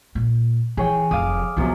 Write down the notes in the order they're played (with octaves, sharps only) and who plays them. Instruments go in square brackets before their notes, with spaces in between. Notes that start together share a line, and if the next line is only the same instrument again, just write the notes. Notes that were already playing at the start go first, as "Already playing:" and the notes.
[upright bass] A#2
[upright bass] E3 [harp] G#4 C#5 G5
[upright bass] F1 [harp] F5 D6 D#6
[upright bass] C2 B3 [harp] F#2 C3 F3